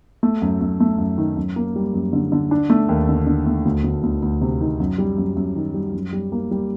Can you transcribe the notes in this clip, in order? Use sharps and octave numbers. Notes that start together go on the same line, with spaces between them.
A3
F#2
F#2
A3
F#2
D#3
F#2
A#3
G3
F#2
D3
D3
D4
A3
D#2
D3
D3
A3
D2
D2
D2
D2
C3
D#3
F#2
G3
F#2
F#2
D#3
G3
F#2
G3
A#3
G3